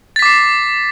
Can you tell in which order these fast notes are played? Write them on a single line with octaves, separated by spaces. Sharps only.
A6 B6 D6 C7